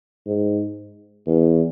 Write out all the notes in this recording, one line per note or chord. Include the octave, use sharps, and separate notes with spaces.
G#2
E2